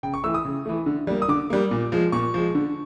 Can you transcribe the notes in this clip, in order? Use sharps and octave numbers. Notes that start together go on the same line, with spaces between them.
C#3 G5
C#6
E3 A3 E6
D#6
C#3
E3 A3
D3
G3 A#3
D#6
D3 D6
G3 A#3
A#2
F3 G#3
A#2 C#6
F3 G#3
D3